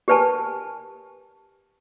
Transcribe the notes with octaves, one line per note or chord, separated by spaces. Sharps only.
G4 A#4 B4 G#5 A5